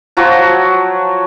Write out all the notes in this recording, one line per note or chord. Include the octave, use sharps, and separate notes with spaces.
F3 F#3 F#4